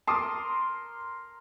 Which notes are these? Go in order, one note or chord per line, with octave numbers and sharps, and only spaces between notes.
A#4 A5 C6 D6 D#6